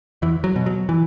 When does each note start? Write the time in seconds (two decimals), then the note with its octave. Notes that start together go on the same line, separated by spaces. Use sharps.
0.22 E2 E3
0.44 F#3
0.56 B2
0.66 F#3
0.89 E3